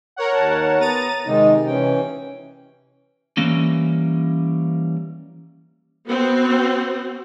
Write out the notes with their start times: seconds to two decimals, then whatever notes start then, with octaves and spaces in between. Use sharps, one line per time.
0.16 A#4 C#5 F#5
0.33 D#2 A5
0.79 B3 A#5 A6 D#7
1.26 C3 D#3 G#3 D#4
1.67 E3 C#4 G5
3.37 E3 G3 A#3 C#4
6.08 B3 C4 F#4